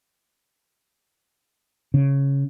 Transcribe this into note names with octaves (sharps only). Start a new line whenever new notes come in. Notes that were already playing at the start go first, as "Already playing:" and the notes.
C#3